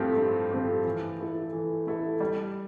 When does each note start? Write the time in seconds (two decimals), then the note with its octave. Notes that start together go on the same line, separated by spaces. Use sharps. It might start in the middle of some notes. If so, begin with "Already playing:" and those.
Already playing: G2 F3 A3 C4 G4
0.17 G2
0.51 F3 A3 C4 G4
0.85 E3
1.20 A3 E4 A4
1.53 E3
1.86 A3 E4 A4
2.20 G3